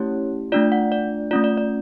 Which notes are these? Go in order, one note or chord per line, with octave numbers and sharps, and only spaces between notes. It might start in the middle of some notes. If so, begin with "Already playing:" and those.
Already playing: A3 C#4 E4 G4 C#5
A3 D4 F4 D5
F#5
D5
A3 C#4 F4 D5
D5
D5